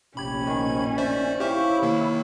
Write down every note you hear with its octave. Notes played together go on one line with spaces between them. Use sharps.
F1 A#1 C#4 G4 B5 G#6
D#3 G#5
C5 D5 E5
E4 G4 C5 C#5 E5 F5 G5
C3 D#3 A#3